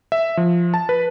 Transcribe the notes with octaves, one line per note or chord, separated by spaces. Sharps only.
E5
F3
A5
B4